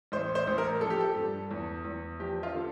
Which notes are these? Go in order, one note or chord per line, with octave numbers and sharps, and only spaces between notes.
A1 C5
C5
A1
A#4
F3 A4
G4
A4
G2
E2
E2
F3 G4
F4
D3